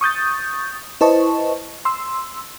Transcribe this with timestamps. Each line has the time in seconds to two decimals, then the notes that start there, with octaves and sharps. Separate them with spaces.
0.01 C#6 D#6 G6 A6
1.01 E4 B4 C5 D#5 A5 C#6
1.85 C6 E6